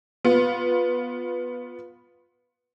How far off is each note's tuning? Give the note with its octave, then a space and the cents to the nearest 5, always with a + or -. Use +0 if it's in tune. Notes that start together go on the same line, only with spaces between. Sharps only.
B3 +0 F4 +15